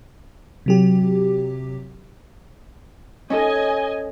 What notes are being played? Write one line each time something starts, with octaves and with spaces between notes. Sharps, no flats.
C3 F#3 G4
C#4 D#4 A4 D#5 G#5